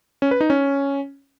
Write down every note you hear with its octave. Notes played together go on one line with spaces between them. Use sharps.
C#4
B4
D#4
C#4